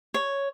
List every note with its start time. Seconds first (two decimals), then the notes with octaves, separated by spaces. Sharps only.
0.14 C#5